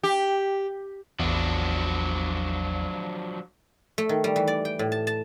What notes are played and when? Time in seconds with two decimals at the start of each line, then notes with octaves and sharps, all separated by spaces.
0.03 G4
1.20 A1 E2 F3 F#3 D4
3.98 A3
4.09 D#3
4.24 G3
4.36 E3
4.47 D5
4.65 G5
4.79 A2
4.92 A5
5.07 A5